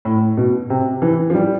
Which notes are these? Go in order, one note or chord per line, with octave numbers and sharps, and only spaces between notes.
A2
B2
C3
E3
F3
G3